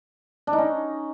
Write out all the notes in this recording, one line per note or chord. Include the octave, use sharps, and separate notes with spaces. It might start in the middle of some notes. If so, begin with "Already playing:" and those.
D4
D#4
C#4